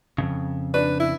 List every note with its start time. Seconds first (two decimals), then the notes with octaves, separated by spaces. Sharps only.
0.18 F2 G#2 C#3
0.74 D4 B4
1.00 E4